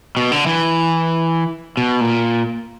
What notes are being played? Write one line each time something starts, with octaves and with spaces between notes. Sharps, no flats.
B2
D3
E3
B2
A#2